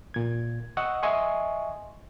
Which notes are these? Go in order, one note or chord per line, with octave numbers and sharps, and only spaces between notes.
A#2 G#6
D#5 F#5 C#6 E6
D#5 E5 G#5 C6 C#6